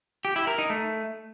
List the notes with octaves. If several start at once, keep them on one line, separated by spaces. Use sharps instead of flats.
G4
E4
A#4
D#4
A3